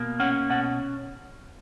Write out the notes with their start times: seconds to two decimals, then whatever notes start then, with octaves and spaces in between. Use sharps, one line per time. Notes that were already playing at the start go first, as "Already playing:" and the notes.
Already playing: B2 A#3
0.20 C#4 F#5
0.50 B2 F#5